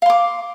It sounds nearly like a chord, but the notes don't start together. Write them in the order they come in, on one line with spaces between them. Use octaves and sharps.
F5 C6 D6